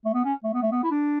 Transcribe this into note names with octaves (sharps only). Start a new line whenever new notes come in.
A3
B3
C#4
A3
B3
A3
B3
E4
D4